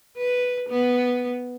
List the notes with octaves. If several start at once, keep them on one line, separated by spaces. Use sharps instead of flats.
B4
B3